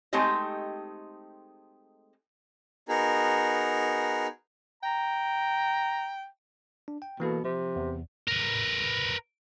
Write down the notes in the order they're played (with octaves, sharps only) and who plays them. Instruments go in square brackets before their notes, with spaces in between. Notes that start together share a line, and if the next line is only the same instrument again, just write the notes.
[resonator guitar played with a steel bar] G#3 A3 C4 D#4 G4 D#5
[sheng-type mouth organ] B3 D#4 F#4 G#4 A#4
[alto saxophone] G5 [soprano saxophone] A#5
[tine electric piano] D4
G5
[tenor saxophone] B2 [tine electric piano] E3 A#3 A4
[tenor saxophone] C3 [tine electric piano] F3
[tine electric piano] E2
[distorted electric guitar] A#4 B4